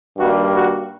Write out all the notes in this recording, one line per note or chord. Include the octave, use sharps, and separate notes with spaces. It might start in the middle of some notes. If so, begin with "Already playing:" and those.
G2 D#3 G3 A#3 F#4
F#4